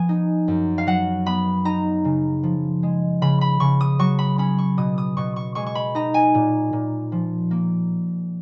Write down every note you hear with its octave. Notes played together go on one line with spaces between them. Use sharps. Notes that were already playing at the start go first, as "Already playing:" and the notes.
Already playing: F3 B3 G#5
D#4
F#2
F5
F#3 F#5
B3 B5
D#4 A#5
C#3
F3
G#3
C#3 B5
B5
C#3 C#6
D#6
F#3 C#6
B5
C#4 B5
C#6
B2 D#6
D#6
B2 C#6
C#6
G#3 C#6
C#6
B5
D#4 A#5
G#5
A#2
A#2
F3
A#3